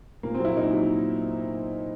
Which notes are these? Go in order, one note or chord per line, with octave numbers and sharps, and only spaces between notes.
A#2 A#3
C4
F#3 E4
A#2 D#4
F#3